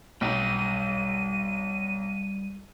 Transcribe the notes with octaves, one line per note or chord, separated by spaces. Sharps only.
B1 G3 D#4 G5 D#7